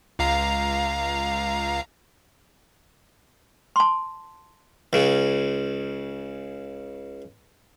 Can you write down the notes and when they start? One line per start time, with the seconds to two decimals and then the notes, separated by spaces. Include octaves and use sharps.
0.19 C#2 F5 A#5
3.76 A5 C6
4.93 C#2 C#3